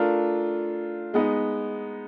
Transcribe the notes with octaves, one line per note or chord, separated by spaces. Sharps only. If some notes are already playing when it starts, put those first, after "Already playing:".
Already playing: A3 D4 F4 A#4
G#3 B3 D#4